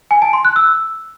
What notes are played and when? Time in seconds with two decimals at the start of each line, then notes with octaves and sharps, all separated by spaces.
0.11 G#5
0.22 A5
0.33 C6
0.45 F#6
0.56 E6